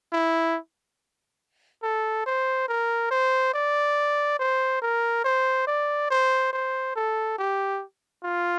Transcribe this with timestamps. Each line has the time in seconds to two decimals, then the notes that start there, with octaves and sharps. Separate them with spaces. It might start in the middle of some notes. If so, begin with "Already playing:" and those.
0.12 E4
1.83 A4
2.26 C5
2.68 A#4
3.11 C5
3.54 D5
4.39 C5
4.81 A#4
5.24 C5
5.67 D5
6.10 C5
6.53 C5
6.96 A4
7.38 G4
8.24 F4